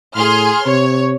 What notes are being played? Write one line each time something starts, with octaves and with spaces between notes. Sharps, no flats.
A2 G#4 C6 F6
C3 C#5